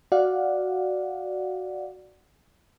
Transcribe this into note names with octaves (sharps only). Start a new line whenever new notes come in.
F#4 D5 F5 F#5